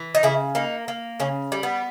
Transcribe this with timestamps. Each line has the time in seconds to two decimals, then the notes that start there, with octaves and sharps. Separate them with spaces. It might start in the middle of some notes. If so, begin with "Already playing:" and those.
Already playing: E3
0.15 D#4
0.23 C#3 E4
0.55 A#3 D#4
0.88 A#3
1.20 C#3 C#4
1.52 G3
1.63 B3